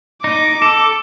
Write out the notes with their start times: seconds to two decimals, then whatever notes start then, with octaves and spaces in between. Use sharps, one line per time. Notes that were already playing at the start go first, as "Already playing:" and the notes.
0.24 D#4 D6
0.62 A4